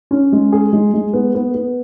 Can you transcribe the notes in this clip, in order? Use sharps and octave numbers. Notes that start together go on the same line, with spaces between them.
C#4
G#3
G#4
G#3
G#3
B3
B3
B3